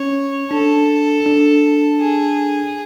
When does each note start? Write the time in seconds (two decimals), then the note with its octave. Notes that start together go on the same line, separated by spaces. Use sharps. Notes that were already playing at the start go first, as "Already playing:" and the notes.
Already playing: C#4 C#5
0.51 D4 A4
1.26 D4
2.01 G#4